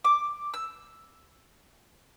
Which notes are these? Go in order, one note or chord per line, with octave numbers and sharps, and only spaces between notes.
D6
E6